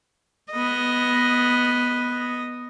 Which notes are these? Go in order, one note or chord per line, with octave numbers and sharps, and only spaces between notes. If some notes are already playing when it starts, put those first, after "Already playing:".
B3 D#5